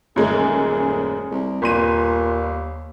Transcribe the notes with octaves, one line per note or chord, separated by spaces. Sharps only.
D#1 F#2 G#3 A3 G#4
C2
G1 D#2 A#2 C6 D#7